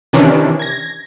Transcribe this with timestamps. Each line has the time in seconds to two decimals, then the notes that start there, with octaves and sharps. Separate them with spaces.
0.13 C3 D#3 E3 C#4 D4
0.60 G#6 A#6